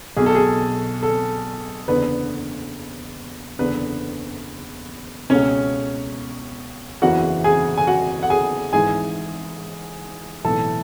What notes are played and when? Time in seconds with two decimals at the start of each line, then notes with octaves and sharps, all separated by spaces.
0.17 B1 B2 G#4
0.26 A4
0.35 G#4
1.03 A4
1.88 F#1 E2 D3 B3 B4
3.59 F#1 E2 D3 B3 B4
5.30 C#2 B2 C#4 C#5
7.02 F#1 E2 C#3 E3 F#4 F#5
7.44 G#4 G#5
7.78 G#5
7.87 F#4 F#5
8.23 F#5
8.30 G#4 G#5
8.73 G#1 G#2 E3 G#4 G#5
10.44 B1 A2 E3 A4 A5